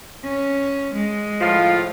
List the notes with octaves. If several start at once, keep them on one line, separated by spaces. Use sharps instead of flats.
C#4
G#3
A2 F3 F4